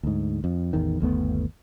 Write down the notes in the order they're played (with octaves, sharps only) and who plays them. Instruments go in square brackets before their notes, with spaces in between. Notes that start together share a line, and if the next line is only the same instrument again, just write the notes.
[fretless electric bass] D2 G#2
F2
A1 E2 D#3
G1 D#2 A3 B3